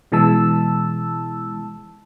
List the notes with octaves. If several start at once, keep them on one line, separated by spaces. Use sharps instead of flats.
B2 E3 G#3 A5 E6